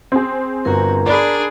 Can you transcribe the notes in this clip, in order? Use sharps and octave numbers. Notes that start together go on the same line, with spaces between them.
C4 G#4
G1 F#4 A#4 A#5
D4 G#4 D5 B5